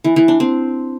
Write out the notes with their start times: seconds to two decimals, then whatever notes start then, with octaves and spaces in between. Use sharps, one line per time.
0.04 E3
0.16 E3
0.28 D4
0.40 C4